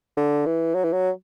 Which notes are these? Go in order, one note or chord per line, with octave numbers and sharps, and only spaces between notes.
D3
E3
F#3
E3
F#3